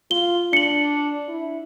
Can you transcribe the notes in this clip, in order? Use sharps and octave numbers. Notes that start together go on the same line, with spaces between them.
F4 G7
D4 C#7 F#7
E4